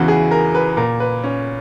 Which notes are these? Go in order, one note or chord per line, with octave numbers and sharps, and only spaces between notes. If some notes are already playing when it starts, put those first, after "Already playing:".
Already playing: E2 C#3 E3 F#4
G#4
A#4
B4
A#2 A#4
B4
C#4